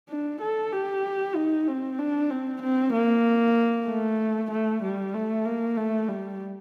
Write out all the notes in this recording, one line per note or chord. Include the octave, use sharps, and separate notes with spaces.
D4
A4
G4
D#4
C4
D4
C4
C4
A#3
A3
A3
G3
A3
A#3
A3
G3